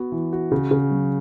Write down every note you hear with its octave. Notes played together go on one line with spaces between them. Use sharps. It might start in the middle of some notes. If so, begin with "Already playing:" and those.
Already playing: B3 F#4
E3
F#4
C#3
C#3
F#3